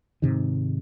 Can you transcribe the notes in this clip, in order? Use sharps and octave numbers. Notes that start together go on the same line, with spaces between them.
G#2 C3 D#3